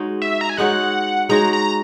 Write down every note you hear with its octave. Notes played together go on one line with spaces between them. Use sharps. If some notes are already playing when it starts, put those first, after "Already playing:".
Already playing: G#3 D#4 F#4 C#5
E5
A#5
G#5
G#3 D#4 F#4 C#5 F#5
G#3 D#4 F#4 C#5 A#5
A#5